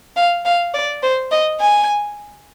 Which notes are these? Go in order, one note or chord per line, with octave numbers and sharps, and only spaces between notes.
F5
F5
D5
C5
D#5
G#5